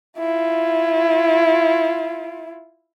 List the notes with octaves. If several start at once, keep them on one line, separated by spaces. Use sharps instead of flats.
E4 F4